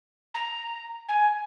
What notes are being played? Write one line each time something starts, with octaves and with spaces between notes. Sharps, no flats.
A#5
G#5